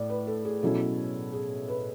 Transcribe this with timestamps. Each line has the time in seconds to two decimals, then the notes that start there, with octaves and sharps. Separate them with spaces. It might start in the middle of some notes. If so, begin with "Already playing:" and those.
Already playing: A2 D5
0.10 B4
0.27 A4
0.45 G#4
0.63 B2 F#3 C#4 E4 A4
1.33 G#4
1.68 B4